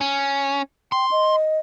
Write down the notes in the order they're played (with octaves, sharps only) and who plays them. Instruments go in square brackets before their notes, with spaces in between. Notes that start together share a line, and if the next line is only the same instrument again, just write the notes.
[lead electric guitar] C#4
[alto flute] G5 [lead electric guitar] C6
[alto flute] D#5